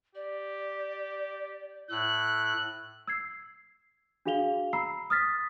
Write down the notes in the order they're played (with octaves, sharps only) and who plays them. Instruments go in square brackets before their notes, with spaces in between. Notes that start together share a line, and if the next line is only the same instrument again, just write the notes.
[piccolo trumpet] G4 [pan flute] D5
[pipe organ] A2 [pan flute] E6 [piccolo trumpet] F#6
[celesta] E6 G#6 C7
D4 F#4 G#4 F5 F7 G7
A#5 B5 E6 C7
D#6 F6 A6 B6